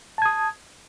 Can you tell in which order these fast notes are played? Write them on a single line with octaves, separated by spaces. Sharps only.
A5 G#6 D#6